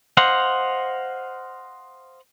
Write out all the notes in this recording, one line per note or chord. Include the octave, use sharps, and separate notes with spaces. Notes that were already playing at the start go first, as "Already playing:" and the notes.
C5 D#5 F5 F#5